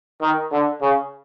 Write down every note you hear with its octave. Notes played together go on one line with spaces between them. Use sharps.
D#3
D3
C#3